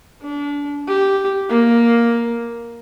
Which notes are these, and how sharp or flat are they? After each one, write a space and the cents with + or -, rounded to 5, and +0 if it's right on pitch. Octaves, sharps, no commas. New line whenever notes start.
D4 -30
G4 -5
A#3 +5